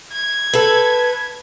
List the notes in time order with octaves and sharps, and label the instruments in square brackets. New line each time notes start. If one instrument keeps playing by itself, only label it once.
[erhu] G#6
[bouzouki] A4 B4